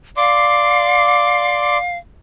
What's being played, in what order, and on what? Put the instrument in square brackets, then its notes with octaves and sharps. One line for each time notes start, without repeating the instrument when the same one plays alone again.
[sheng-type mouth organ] D5 C6 D6 [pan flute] F5